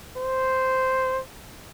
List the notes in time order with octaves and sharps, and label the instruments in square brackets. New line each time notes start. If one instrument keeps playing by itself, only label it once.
[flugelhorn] C5